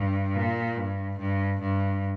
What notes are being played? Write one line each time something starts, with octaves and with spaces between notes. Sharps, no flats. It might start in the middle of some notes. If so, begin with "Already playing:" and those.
Already playing: G2
A#2
G2
G2
G2